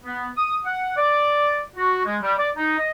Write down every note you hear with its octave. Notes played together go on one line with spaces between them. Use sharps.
B3
D#6
F#5
D5
F#4
G#3
G3
D5
D#4
D#5